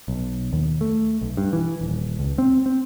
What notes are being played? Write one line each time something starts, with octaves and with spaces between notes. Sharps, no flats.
B1
D#2
A3
B1
G2
E3
D#1
C#2
C4
C4